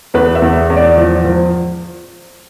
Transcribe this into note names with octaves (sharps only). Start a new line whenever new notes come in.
E2 B4
E5
E2
E2
D5
F3
F3